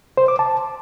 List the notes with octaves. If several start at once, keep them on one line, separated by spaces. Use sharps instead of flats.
C5
D6
A5